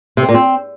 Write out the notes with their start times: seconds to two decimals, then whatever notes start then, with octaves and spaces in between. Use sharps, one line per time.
0.17 C3
0.23 C4
0.29 A#2
0.34 C4